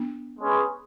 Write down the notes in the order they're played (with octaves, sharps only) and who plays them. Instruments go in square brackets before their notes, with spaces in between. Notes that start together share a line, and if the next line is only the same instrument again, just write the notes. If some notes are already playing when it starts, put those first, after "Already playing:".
Already playing: [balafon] B3 D4
[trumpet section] G#3 C#4 G#4 B4